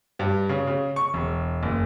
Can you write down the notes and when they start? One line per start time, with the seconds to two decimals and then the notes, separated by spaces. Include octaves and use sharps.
0.19 G2
0.49 C#3
0.67 C#3
0.96 C#6
1.14 E1
1.63 F#1